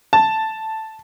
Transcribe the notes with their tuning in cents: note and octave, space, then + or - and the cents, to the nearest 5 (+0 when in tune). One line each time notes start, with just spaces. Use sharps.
A5 +0